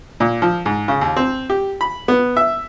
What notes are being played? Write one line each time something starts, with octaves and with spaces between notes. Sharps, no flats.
A#2
F3
G#2
C#3
D#2
C4
G4
B5
B3
E5